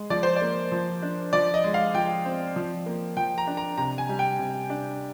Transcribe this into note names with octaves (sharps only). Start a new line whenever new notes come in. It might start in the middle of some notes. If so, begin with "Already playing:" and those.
Already playing: G#3
F3 D5
C5
D5
A#3
F3
D4
F3 D5
D#5
G#3
F5
F3 G5
C4
F3
A#3
F3 G5
A#5
D4
A#5
C3 A#5
G#5
G3
G5
C3
D4